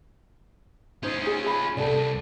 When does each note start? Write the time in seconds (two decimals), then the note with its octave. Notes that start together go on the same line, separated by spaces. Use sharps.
1.03 C#4 D#4 F4 C5
1.22 D#4 G#4
1.46 B5
1.77 C2 A4 D5